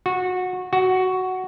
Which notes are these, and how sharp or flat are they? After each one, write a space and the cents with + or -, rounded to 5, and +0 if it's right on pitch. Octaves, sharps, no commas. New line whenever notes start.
F#4 -20
F#4 +5